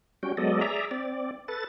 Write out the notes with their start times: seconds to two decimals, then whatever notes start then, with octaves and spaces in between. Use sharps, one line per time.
0.23 G3 C#4 F#4 G5
0.37 F#3 G#3 B3 A4 D5 D#5
0.61 G#4 D5 E5 A#5
0.91 C4 D5
1.48 A4 B4 A6